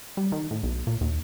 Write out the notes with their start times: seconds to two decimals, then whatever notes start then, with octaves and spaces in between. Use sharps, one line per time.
0.17 G3
0.32 D#3
0.51 A2
0.63 B1
0.87 A#2
1.01 D#2